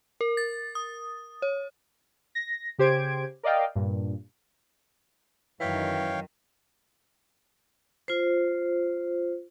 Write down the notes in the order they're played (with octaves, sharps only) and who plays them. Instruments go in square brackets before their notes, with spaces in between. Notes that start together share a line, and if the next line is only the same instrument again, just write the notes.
[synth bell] A#4
A6
D#6
C#5
[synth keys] A#6
C#3 G4 C5 G#6 D7
A#4 D5 D#5 F5 G5
G2 A#2
[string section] F#2 D#3 [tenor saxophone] E3 [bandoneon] C#5 F5 G5
[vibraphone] F4 C5